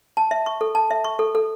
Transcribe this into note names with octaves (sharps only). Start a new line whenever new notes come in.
A5
E5
C#6
A4
A5
E5
C#6
A4
A4